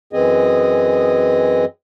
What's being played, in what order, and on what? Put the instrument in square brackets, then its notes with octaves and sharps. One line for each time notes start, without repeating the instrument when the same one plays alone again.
[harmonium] F#2 E3 C4 G#4 D#5